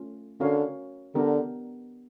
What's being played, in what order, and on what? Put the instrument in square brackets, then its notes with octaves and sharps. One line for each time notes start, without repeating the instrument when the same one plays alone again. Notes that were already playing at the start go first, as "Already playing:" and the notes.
Already playing: [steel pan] A3 C#4 F4
[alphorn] D3 [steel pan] C#4 F#4 A#4 C#5 F5
[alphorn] D3 [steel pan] B3 D4 G4 A#4